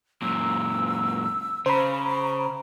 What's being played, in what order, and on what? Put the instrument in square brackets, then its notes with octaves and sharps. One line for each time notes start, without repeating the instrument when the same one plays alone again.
[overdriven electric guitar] F#2 A#2 [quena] E6
[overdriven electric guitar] C#3 [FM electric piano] C5 B5 [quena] A#5